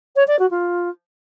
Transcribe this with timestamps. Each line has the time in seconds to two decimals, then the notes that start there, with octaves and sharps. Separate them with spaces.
0.15 C#5
0.27 D5
0.39 F#4
0.50 F4